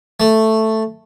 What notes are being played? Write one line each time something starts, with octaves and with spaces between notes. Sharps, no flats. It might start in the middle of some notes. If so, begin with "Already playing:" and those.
A3